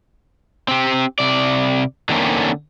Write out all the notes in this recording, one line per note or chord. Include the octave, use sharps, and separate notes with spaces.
C4 G4
C3 D5
D3 D#3 A3 A#3 C4 C#4